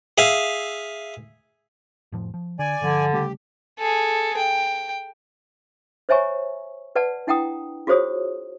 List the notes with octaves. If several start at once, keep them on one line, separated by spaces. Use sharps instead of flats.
G#4 E5 F5
F1 A2 F3
F3
D3 D5 G#5
G1 D3 F3
C#3 G3 A3 G4
G#4 A4
G5
C5 C#5 E5 G#5 A#5 C#6
B4 D5 F#5 A5
D4 E4 F#5 G5 A#5 D#6
F4 F#4 G#4 C5 C#5 D#6